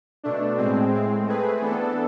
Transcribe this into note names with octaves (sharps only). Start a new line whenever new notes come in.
B2 A3 D4
A2 G#3 C4
A2 G#3 C4
A3 C4 G#4 B4
E3 B3 D4 A4